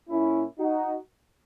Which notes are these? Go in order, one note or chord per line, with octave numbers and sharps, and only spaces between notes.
A#2 A#3 C#4 E4
D#4 F#4